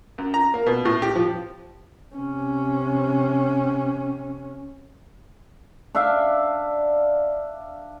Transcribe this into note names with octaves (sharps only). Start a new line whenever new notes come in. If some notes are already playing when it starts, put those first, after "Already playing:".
F#2
A#5
A#3
B2
A2
G4
F3
C3 C#4
D4 E5 F5